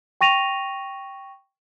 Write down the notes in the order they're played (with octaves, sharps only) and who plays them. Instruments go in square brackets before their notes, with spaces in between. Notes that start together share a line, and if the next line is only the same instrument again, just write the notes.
[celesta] G5 C#6 A#6 D#7 F7